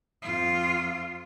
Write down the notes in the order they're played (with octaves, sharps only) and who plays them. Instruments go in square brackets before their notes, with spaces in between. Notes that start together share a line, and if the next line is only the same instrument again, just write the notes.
[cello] F2 F4